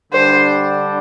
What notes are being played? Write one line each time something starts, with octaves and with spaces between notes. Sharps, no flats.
D3 G3 D4 G4 C5